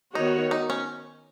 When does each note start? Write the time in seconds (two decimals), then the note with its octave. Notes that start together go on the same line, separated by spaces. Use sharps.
0.15 D#3 B3 D#4 F#4 C#5
0.51 D#4
0.70 C#4